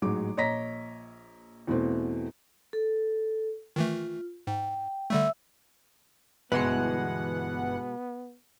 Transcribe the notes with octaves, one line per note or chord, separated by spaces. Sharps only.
A1 G#2 F#3 G#3 D6
A#1 C#5 D#5 A#5 A#6 B6
E2 B2 E3 A3 C4
A4
D#3 E3 A3 F4
G#2 G5
D3 G3 A3 E5 E6
G1 B2 E3 G#3 B3 B4 F#5 C6